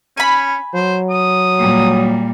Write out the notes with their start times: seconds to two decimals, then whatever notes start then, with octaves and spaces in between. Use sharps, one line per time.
0.17 C#4 G#5 B5
0.74 F#3 C5
1.10 D#6
1.59 A#2 G3